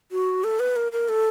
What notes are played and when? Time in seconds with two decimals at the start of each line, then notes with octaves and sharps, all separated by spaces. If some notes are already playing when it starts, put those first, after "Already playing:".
0.12 F#4
0.44 A4
0.60 B4
0.76 A#4
0.92 A#4
1.09 A4